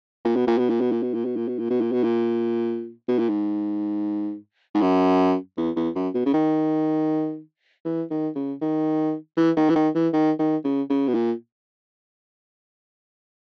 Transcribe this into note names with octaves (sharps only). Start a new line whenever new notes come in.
A#2
B2
A#2
B2
A#2
B2
A#2
B2
A#2
B2
A#2
B2
A#2
B2
A#2
B2
A#2
B2
A#2
G#2
G#2
F#2
E2
E2
F#2
B2
C#3
D#3
E3
D#3
C#3
D#3
E3
D#3
E3
D#3
E3
D#3
D#3
C#3
C#3
B2
A#2